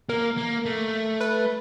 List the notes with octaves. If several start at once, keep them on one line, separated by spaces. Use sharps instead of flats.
A#3 A#4
A#3
A3
B4